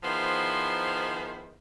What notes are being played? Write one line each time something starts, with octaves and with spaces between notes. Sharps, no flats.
D#3 F3 B3 E4 G#4 C5